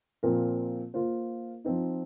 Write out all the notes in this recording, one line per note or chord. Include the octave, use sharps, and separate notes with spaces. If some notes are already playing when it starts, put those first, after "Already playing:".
A#2 F3 C4 F4 A#4
A#3 F4 C5
F3 C4 D#4